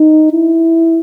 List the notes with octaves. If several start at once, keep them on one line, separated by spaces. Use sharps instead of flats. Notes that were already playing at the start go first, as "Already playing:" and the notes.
Already playing: D#4
E4